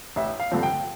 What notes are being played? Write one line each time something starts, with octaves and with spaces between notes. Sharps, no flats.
A1 E5
F5
G2 D3 F3 C4
G5